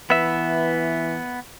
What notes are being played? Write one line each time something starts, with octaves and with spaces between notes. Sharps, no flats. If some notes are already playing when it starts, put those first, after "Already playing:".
E3 B3 E5